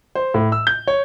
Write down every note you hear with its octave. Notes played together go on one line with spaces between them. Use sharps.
C5
A2
E6
G6
C#5